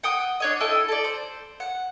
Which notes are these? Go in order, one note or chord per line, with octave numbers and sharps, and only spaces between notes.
F#5 G5 D#6
D4 C#5 D#5
E4 A4 D#5 G5
A4 D5
C5
F#5